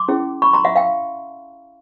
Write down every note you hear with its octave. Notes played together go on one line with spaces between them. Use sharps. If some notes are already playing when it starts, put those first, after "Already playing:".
Already playing: C6 D6
C#4 E4 G#4
B5 C#6
A#5 C6
E5 F#5
F5 G5